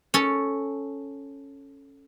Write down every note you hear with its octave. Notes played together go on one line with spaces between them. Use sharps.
C#4 A4